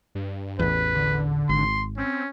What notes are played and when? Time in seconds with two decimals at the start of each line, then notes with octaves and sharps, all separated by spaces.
0.15 G2
0.59 A1 E2 B4
0.94 D3
1.49 G#1 C6
1.97 C4 C#4